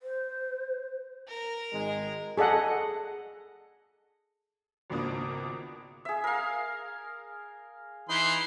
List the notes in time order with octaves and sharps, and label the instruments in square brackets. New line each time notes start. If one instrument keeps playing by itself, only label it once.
[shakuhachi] C5
[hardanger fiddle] A#4
[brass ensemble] G#1 D#3 G#3
[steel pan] G#4 A4 D#5 F#5
[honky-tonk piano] G#1 C#2 B2 A#3 D4 D#6
[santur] G#4 E5
A#4 F5
[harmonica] E3 B4 C6 [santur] D#4